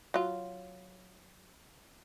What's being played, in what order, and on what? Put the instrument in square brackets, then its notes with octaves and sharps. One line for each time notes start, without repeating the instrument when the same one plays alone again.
[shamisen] F#3 F4